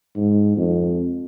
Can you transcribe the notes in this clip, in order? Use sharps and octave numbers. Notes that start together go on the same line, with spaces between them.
G#2
F2